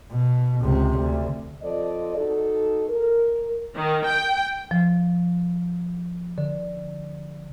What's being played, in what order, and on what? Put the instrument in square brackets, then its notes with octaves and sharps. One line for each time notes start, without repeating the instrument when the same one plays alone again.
[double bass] B2
C#2 C3
D2
[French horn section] F3 C4 A4 D5 D#5
D#4 F#4 A4
A#4
[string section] D#3
G5
[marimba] F3
D3